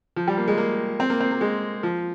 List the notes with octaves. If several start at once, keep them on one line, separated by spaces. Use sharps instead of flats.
F3
G3
A#3
G#3
A#3
C4
A#3
C4
A#3
G#3
F3